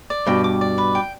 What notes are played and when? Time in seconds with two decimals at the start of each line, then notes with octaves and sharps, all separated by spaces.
0.10 D5
0.27 G2 B2 G5
0.44 D6
0.61 D5
0.78 B4
0.95 G5